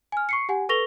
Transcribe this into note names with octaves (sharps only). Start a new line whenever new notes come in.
G#5 F6
C#6 C7 C#7
G4 F#5 G#5
A4 B4 C#6 A#6 F7 G7